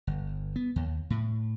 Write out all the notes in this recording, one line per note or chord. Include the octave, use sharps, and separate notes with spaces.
G1
B3
D#2
A2